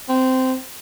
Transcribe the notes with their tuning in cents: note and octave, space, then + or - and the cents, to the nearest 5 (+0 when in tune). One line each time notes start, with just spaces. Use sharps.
C4 -15